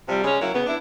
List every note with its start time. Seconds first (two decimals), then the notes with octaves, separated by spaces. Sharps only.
0.08 C3 F3 G3
0.22 C#3 G#3 C#4
0.40 F#3 A#3 E4
0.53 C#3 B3
0.66 D4 E4